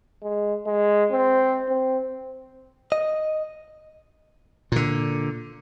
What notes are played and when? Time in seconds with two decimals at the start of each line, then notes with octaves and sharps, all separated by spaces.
0.22 G#3
0.66 G#3
1.12 C4
1.68 C4
2.92 D#5
4.72 A#2 D3